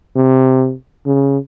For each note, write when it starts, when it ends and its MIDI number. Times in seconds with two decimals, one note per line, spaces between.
0.16 0.73 48
1.06 1.38 49